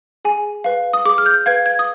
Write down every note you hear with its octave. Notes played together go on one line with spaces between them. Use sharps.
G#4 G#5
B4 F5
D#6
G#4 D6
F6
G6
B4 F5 G#6
G#6
D#6